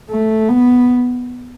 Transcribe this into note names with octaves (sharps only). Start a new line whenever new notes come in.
A3
B3